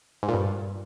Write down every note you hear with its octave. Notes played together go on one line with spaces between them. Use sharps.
G#2
A#2
G2